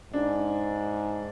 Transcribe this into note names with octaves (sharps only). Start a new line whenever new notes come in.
G#2 D4